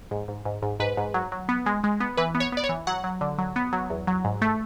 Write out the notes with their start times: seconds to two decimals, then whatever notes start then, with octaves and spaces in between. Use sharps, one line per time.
0.11 G#2
0.28 G#2
0.45 G#2
0.62 G#2
0.80 G#2 B4
0.97 G#2
1.14 F#3
1.32 F#3
1.49 B3
1.66 G#3
1.84 G#3
2.00 B3
2.17 E3 B4
2.35 B3
2.40 C#5
2.52 B3 D5
2.64 C#5
2.69 E3
2.87 F#3 F#5
3.04 F#3
3.21 D3
3.38 F#3
3.56 B3
3.73 F#3
3.90 E2
4.07 F#3
4.25 G#2
4.42 A3